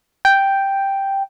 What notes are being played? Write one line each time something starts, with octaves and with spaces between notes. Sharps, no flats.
G5